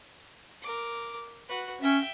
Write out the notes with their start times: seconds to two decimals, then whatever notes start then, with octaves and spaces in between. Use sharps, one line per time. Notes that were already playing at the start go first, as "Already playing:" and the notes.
0.62 A#4 D6
1.48 F#4 B4
1.81 C#4 E5 G5